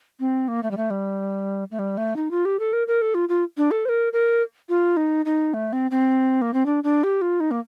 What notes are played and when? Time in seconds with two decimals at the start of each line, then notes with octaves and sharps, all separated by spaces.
0.20 C4
0.48 A#3
0.63 A3
0.71 G3
0.77 A3
0.90 G3
1.71 A3
1.79 G3
1.98 A3
2.16 D#4
2.31 F4
2.45 G4
2.59 A4
2.73 A#4
2.87 A#4
3.02 A4
3.15 F4
3.29 F4
3.57 D4
3.71 A4
3.85 C5
3.89 A#4
4.13 A#4
4.69 F4
4.97 D#4
5.25 D#4
5.54 A3
5.73 C4
5.91 C4
6.42 A#3
6.54 C4
6.66 D4
6.84 D4
7.04 G4
7.22 F4
7.40 D#4
7.51 A#3